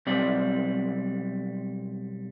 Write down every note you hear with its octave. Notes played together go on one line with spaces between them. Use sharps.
B1 G3 C4 D5